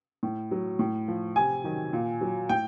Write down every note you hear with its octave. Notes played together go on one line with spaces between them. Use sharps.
A2
F#3
A2
F3
C3 G#5
D#3 F#3
A#2
F#3
A2 G5